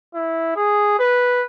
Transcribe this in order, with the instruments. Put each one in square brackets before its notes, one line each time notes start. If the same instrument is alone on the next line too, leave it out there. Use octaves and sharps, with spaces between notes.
[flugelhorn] E4
G#4
B4